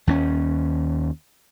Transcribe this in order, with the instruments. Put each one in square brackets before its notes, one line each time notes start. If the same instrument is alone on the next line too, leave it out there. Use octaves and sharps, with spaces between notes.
[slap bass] D#2 B3 C#4